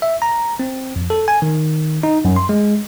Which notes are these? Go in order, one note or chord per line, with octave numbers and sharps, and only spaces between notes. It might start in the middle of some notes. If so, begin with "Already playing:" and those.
E5
A#5
C4
F2
A4
G#5
D#3
D#4
F#2
C6
G#3